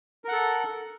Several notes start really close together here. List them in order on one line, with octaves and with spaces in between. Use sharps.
A#4 F#5 A4